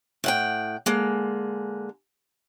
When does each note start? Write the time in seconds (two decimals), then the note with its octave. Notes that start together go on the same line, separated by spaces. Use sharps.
0.24 A2 F#5 G5
0.86 D3 G#3 A#3